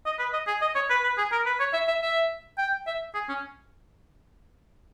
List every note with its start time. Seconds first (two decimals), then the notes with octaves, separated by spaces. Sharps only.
0.06 D#5
0.19 B4
0.33 D#5
0.47 G#4
0.62 D#5
0.75 C#5
0.90 B4
1.04 B4
1.18 G#4
1.32 A#4
1.46 B4
1.60 C#5
1.74 E5
1.88 E5
2.02 E5
2.58 G5
2.87 E5
3.15 G#4
3.29 C#4